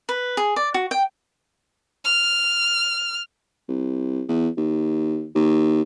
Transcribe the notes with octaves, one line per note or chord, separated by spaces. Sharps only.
B4
G#4
D5
F#4
G5
F6
C2
E2
D#2
D#2